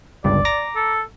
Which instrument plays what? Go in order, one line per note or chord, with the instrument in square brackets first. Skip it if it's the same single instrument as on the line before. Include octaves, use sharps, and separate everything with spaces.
[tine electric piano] G1 C#2 G2 [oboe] D5
[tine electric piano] A#5 D6 A#6
[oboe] A4